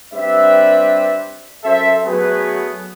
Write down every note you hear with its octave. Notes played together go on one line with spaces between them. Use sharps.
G2 C4 B4 D5 E5
F#2 A4 C5 E5
F#3 A3 B3 G#4 B4